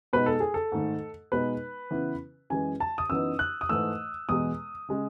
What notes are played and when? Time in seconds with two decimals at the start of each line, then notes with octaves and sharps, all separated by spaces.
0.13 B2 G#3 D#4 B4
0.26 A4
0.40 G#4
0.54 A4
0.72 G#2 D#3 A3
1.32 B2 G#3 D#4 B4
1.91 C#3 E3 B3 E4
2.50 F#2 E3 G#3 G#5
2.80 A5
2.98 D#6
3.09 F#2 E3 B3 D#4 E6
3.39 F#6
3.61 D#6
3.69 G#2 E3 A3 E6
4.29 E2 B2 G#3 D#6
4.89 C#3 G#3